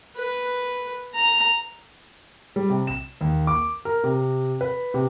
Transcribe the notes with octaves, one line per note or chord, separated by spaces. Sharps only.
B4
A#5
G3
C3
E7
D#2
D6
A#4
C3
B4
C3